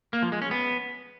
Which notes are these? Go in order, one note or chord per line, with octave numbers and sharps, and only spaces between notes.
A#3
F3
G#3
C#4
B3